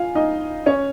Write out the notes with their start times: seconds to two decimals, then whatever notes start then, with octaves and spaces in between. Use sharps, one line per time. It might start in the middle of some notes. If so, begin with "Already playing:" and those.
Already playing: F4 F5 G#5
0.15 D#4 D#5
0.66 C#4 C#5